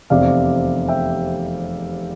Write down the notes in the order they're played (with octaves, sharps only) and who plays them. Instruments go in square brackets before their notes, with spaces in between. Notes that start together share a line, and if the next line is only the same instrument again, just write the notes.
[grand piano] F1 E2 C3 D5 F5
E5 G5